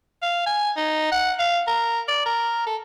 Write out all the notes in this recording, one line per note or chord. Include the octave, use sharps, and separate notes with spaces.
F5
G#5
D#4
F#5
F5
A#4
D5
A#4
A4